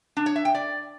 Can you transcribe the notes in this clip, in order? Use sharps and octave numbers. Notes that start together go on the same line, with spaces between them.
D4
C#5
E5
G5
D5